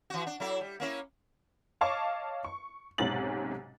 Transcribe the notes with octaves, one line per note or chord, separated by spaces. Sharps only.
E3 F#4
D4
F#3 E4 A4
G3
A#3 C#4 E4
C#5 D#5 F5 A5 C#6 D6
C#6
B1 G#2 C3 C#4 A6 F#7